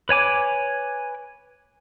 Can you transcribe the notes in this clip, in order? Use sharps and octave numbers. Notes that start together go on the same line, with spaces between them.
B4 C#5 G#5 D6